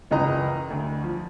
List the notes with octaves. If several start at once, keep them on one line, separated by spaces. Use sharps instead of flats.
F#1 C#2 E3 B4 D#5 A#5
D2
F3